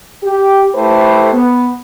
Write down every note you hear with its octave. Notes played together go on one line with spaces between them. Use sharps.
G4
A3 E4 G4 A4 B4 C5
B3